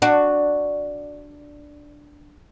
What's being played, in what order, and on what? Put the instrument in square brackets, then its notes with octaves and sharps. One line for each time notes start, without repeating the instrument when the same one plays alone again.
[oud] D4 F#4